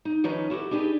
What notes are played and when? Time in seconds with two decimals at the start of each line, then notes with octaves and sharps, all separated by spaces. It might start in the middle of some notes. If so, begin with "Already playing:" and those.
0.05 D#4
0.24 D#3 F3 C#4 D#4 B4 A#5
0.50 E4 F#4 G4 A4
0.71 D4 D#4 G4 G#4 B4